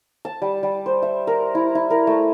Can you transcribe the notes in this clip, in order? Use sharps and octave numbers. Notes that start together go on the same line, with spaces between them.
A5
G3
G3
C5
E5
A#4
E4
E4
A#4
A3